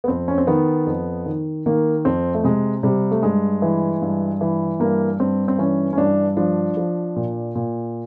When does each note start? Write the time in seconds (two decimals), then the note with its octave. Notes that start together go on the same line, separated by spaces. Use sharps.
0.04 B3
0.08 F2 C4
0.28 C#4
0.38 C4
0.47 D#3 B3
0.86 F2
1.26 D#3
1.66 D#3 A#3
2.05 F2 C4
2.34 A3
2.44 C3 G#3
2.83 C3 G3
3.11 A3
3.23 G2 G#3
3.62 E3
4.02 G2
4.41 E3
4.79 G2 A#3
5.20 G2 C4
5.48 C4
5.58 E3 C#4
5.93 C#4
5.98 G2 D4
6.37 F3 D4
6.77 F3
7.16 A#2
7.55 A#2